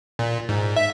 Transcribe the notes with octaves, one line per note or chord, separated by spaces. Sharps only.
A#2
G#2
E5